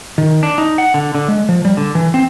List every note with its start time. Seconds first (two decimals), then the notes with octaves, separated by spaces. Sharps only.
0.18 D#3
0.43 D4
0.58 D#4
0.78 F#5
0.94 D3
1.15 D3
1.28 G#3
1.49 F3
1.65 G3
1.77 D3
1.95 E3
2.14 C4